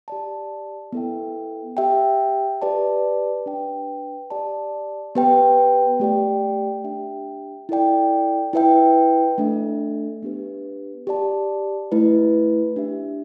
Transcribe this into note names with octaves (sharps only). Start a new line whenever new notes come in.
G4 D5 A5
B3 E4 A4 E5 G5
G4 E5 G5
G4 B4 D5 A5
D4 B4 G5
G4 D5 A5
B3 G4 B4 G5
A3 G4 D5 G5
D4 G4 E5 G5
E4 A4 D5 G5
E4 B4 E5 G5
A3 D4 A4 E5
B3 D4 G4 B4
G4 D5 A5
A3 E4 B4
D4 G4 E5